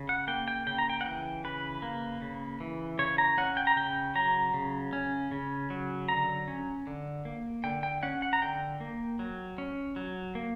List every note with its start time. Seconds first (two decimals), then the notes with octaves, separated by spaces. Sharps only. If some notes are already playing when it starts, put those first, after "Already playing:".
Already playing: C#3
0.09 F#5
0.27 A#3 G5
0.48 G5
0.67 C#3 G5
0.78 A#5
0.90 G5
1.01 F#5
1.05 E3 G5
1.44 C#3 B4
1.82 A#3
2.22 C#3
2.60 E3
2.99 C#3 C#5
3.18 A#5
3.38 C#4 F#5
3.57 G5
3.67 A#5
3.76 C#3 G5
4.15 F#3 A#5
4.54 C#3
4.93 C#4
5.31 C#3
5.70 F#3
6.09 D3 A#5
6.48 C#4
6.87 D3
7.25 A#3
7.64 D3 G5
7.83 G5
8.03 C#4 F#5
8.22 F#5
8.33 A#5
8.42 D3 G5
8.80 A#3
9.19 F#3
9.58 C#4
9.96 F#3
10.35 A#3